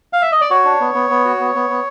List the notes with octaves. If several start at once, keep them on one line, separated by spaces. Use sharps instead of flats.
F5
E5
D#5
D5
F#4 C#5
D4
B3
B3
B3
F#4
B3
B3
B3